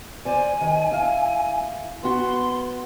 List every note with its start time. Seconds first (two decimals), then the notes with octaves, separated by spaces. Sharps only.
0.25 C5 D5 G#5
0.61 D#3
0.91 E4 F5
2.03 B3 F#4 C6